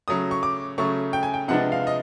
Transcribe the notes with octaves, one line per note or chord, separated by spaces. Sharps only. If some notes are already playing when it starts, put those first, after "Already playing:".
C#3 F#3 A3 D#6
C#6
D6
C#3 F#3 A3 C#6
G5
G#5
G5
C3 F3 G#3 B3 D4 F#5
F5
D#5